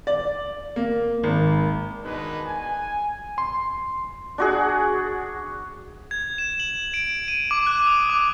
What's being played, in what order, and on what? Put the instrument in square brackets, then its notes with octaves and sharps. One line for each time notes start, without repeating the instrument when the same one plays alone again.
[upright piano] D5
A#3
G#1
[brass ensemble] B2 D#3 G#3 D4 D#4 B4
G#5
[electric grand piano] C6
[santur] D4 F#4 G#4
[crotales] G#6
E7
F#7
D7
D#7
D6
F#6
D#6
D6